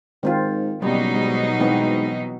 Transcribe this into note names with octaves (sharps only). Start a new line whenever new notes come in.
G#2 D#3 C4 F4
F#1 B2 F#3 G3 D#4
G#2 G3
G#2 E3 B3 C4